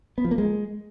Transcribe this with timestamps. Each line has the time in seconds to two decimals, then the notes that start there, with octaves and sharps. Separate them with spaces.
0.18 B3
0.24 F3
0.31 A#3
0.38 G#3